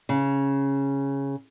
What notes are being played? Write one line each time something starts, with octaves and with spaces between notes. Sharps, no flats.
C#3